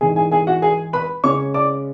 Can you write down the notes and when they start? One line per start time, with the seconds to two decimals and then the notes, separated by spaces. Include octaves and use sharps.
0.01 G#2 E3 G#3 G#4 G#5
0.16 G#4 G#5
0.31 G#4 G#5
0.47 F#4 F#5
0.62 G#4 G#5
0.93 B4 B5
1.24 C#3 G#3 C#4 C#5 C#6
1.54 D5 D6